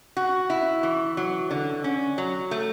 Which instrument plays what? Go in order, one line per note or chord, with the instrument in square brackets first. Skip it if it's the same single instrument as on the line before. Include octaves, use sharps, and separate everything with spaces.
[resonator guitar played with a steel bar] F#4
E4
E3
F#3
D3
C#4
F#3
A3